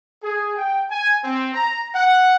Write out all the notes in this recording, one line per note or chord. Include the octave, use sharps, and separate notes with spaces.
G#4
G5
G#5
C4
A#5
F#5